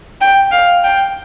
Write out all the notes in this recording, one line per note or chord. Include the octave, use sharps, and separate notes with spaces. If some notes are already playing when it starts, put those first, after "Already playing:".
G5
F5
G5